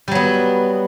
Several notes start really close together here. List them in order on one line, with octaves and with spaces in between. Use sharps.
G3 F#3 B3